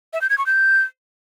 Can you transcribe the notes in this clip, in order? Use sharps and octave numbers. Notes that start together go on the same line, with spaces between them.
E5
G6
G#6
C#6
G6